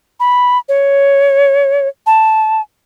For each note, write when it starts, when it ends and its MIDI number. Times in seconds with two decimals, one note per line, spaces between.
0.20 0.58 83
0.69 1.88 73
2.06 2.61 81